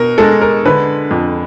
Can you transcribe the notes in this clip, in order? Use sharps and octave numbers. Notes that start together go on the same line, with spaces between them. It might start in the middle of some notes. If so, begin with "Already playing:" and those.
Already playing: B2 A#4
G#3 A4
A#4
D3 B4
F2